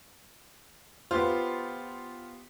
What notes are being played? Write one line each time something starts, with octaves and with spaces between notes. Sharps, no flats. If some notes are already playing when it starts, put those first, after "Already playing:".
B3 F4 G4 C5